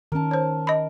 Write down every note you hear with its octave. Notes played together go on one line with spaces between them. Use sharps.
D#3 C#4 A#4 A5
C5 C#5
D#5 B5